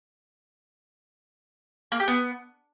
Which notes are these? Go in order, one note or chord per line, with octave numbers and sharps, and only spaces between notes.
A#3
G4
B3